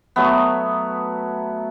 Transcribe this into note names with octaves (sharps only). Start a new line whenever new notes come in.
F#3 A3 B3